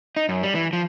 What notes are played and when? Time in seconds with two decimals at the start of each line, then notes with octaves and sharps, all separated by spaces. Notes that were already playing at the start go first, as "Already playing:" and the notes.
0.16 D#4
0.29 F#2
0.43 G3
0.55 E3
0.73 F3